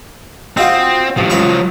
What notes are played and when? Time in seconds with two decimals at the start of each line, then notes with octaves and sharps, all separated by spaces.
0.57 C4 D#4 F4 F#4
1.18 A1 F3 F#3
1.30 C#2 B5 C#6